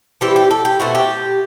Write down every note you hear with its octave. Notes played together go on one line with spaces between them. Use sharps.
E3 G3 C4 E4 G4
G4
A4
G4
B2 A3 C4 E4 F#4
G4